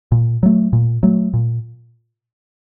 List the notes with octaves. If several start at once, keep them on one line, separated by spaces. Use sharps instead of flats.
A#2
F#3 A3
A#2
F#3 A3
A#2